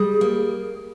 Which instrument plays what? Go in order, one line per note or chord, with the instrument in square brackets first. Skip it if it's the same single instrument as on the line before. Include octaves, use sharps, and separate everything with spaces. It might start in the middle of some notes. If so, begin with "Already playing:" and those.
Already playing: [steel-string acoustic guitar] G3 [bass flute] G#4
[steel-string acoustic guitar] A#3